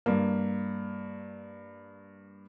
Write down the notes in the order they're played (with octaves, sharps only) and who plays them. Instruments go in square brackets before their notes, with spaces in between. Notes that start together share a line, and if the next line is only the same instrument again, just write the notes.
[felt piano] G2 A#3